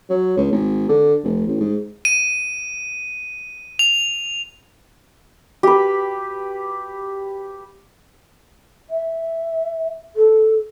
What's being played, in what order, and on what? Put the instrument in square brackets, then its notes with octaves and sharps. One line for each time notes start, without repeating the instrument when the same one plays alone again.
[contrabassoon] F#3
C#2
G#1
D3
F1
A1
G#2
[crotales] D#7
F7
[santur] G4 B4
[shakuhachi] E5
A4